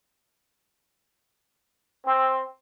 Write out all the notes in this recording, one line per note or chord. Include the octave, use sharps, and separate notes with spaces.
C4